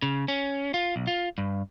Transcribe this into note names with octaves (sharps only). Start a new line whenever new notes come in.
C#3
C#4
F4
B1
F4
G2